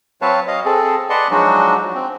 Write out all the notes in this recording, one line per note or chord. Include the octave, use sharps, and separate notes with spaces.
F#3 C4 B4 C#5 F5 A5
D#5 F5
C4 G#4 A4
B4 D5 D#5 F#5 A5 C6
F3 F#3 G#3 D4 D#4 F#4
C4